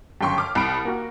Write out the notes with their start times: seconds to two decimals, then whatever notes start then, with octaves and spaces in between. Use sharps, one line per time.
0.21 G1 F#2 G5 C6 C#6
0.38 D6 F6
0.55 C2 B5 D7
0.85 A#3 F#4